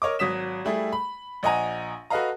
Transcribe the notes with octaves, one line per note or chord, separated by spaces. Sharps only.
A#4 C#5 D#5 D6
G#1 F#3 D#6 B6 E7
G3 A3 E4 G#4
B5
A#1 D#5 F#5 G#5 A#5 D#7
F#4 A4 B4 D#5 F5 A#5